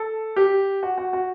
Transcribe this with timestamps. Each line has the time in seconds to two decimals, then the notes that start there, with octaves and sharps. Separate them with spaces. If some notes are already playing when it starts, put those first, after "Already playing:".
Already playing: A4
0.36 G4
0.83 F#4
0.98 F#4
1.13 F#4